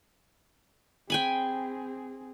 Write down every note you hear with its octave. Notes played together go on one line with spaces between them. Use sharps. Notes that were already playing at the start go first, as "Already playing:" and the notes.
C4 G#4 G5 G#5 B5